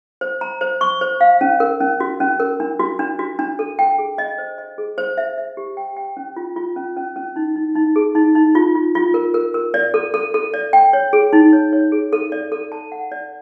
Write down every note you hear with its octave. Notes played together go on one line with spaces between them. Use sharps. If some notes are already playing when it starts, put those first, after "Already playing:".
C5
A#5
C5
C#6
C5
F5
C#4
A#4
C#4
F#4
C#4
A#4
D4
F#4
D4
F#4
D4
A4
G5
G#4
D#5
C5
D#5
G#4
C5
E5
E5
G4
G5
G5
C#4
F4
F4
C#4
C#4
C#4
D#4
D#4
D#4
G#4
D#4
D#4
F4
F4
F4
A#4
A#4
A#4
D5
A4
A4
A4
D5
G5
C#5
G#4
D#4
C#5
C#5
G#4
A4
D5
A4
A5
F#5
D5